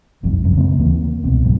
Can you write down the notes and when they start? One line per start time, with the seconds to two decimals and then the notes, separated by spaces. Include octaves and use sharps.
0.23 E1 B1 F2 G#2
0.43 F#1 C2 F#2 C3
0.57 C#3 G#3 A#3 C4
0.79 D#2 E3 A#3
1.24 C2 B2 C4
1.45 A#1 G#2 F#3 A#3